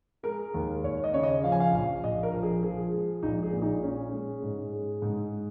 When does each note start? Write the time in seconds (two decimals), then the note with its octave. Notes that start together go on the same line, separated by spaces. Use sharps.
0.23 G#3 A#4
0.54 D#2
0.83 D#2 C#5
1.04 D#5
1.13 C#3 C#5
1.23 D#5
1.43 F3 F5
1.52 G#5
1.60 F5
1.73 A#1
2.03 A#1 D#5
2.23 A#4
2.33 F3
2.43 G#4
2.63 F3 G#4
2.92 G#3
3.23 A#1 D#4
3.43 G#4
3.52 A#2
3.62 D#4
3.82 G#3 C#4
4.12 G#3
4.43 G#2
4.73 G#3
5.02 G#2